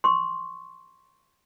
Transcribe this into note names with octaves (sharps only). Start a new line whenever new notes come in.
C6 C#6